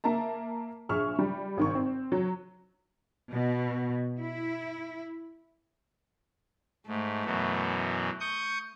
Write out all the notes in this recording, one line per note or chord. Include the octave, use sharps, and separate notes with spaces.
A#3 E5 A5 A#5
A#1 G#4 E5 C#6 F6
G3
G#1 D#3 C#6
C4
F#3
B2
E4
G#2 A3
F#2 B2 E3
C#6 D#6 G6